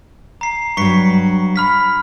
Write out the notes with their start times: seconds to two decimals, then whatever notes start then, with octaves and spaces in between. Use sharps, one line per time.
0.41 A#5 C7
0.77 G2 F#3 C#6 B6 C#7
1.56 B5 F6 B6